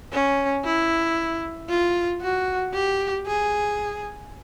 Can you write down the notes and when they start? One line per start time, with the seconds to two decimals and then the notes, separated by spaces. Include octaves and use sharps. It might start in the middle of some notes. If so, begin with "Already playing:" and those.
0.12 C#4
0.65 E4
1.69 F4
2.21 F#4
2.74 G4
3.27 G#4